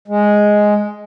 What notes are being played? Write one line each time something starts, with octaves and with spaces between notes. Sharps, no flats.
G#3